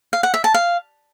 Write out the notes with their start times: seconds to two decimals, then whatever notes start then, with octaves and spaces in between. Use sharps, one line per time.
0.13 F5
0.23 F#5
0.34 E5
0.44 A5
0.54 F5